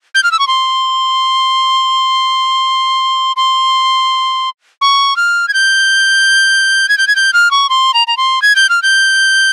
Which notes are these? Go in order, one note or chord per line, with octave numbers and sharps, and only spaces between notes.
G6
F6
E6
C#6
C6
C6
C#6
F6
G#6
G6
G#6
G6
G#6
G6
F6
C#6
C6
A#5
A#5
C6
G#6
G6
F6
G6